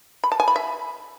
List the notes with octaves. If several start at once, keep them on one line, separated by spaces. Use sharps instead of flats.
B5
A5
G#5
B5
E5